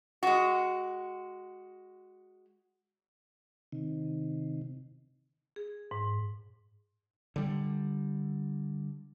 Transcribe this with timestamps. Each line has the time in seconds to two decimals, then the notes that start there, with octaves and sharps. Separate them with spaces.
0.23 G#3 F#4
3.72 C3 D#3
5.56 G#4
5.91 G#2
7.36 D3 G3